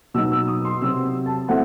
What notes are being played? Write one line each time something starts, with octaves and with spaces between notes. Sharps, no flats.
B2 F#3 B3 D#4 E6
E6
D#6
C6
C3 F#3 C4 E6
A5
F#3 A3 C4 E4 F#5